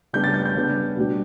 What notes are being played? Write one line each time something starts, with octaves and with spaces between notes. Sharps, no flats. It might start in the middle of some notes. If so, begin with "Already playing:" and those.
C#3 G3 B3 D4 G6
A6
G6
G6
C#3 G3 B3 D4
B2 G3 D4